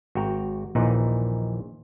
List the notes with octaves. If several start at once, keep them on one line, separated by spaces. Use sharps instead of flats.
G#1 F#4 G5 A#5
A#1 D#2 A#2 E3 D#4 F#5